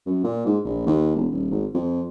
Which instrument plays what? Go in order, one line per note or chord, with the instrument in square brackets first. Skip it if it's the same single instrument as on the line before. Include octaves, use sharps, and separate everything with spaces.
[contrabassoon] F#2
A#2
G#2
A#1
D#2
E1
D#1
G#1
F2